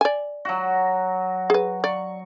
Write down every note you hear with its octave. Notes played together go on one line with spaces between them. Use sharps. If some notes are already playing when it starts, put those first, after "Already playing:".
D5 G#5
F#3 F#4
G#4 B4
D5 C#6